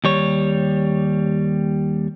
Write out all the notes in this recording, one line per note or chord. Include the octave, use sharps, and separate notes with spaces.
D#2 G3 C#5